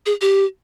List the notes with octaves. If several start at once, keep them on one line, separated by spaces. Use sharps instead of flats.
G#4
G4